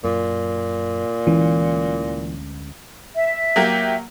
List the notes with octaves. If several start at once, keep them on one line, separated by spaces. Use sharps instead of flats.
F#2 A#2
D2 E3 G#3 C#4
E5
F#3 A#3 G4